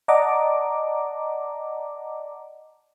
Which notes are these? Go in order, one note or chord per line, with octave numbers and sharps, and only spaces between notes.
D5 D#5 F#5 A5 A#5 D6